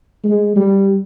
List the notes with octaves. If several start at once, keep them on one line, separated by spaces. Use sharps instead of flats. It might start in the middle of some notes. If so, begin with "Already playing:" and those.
G#3
G3